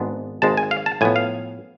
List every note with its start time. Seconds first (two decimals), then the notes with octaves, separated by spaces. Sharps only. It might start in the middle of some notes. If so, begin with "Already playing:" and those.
Already playing: G#1 G#2 G#3 B3 D4
0.42 G#1 G#2 G#3 A5
0.57 G#5
0.71 F5
0.86 A5
1.01 A2 F3 B3 G#5
1.16 F5